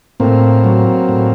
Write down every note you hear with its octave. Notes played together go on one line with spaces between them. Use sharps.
A2 A#3 C4
F#3
A2